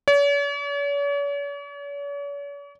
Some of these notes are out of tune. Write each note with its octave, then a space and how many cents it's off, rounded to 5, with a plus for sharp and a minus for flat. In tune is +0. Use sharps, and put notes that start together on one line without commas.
C#5 +45